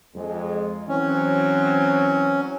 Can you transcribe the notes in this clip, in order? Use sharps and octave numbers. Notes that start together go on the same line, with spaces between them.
F2 G#3
E3 F#3 C4 C#4